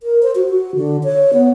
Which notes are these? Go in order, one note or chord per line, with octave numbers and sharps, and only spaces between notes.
A#4
C5
F#4
F#4
D3
C#5
B3